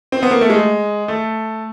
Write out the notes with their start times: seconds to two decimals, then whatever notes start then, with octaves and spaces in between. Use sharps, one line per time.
0.12 C4
0.23 B3
0.31 A#3
0.41 A3
0.50 G#3
1.08 A3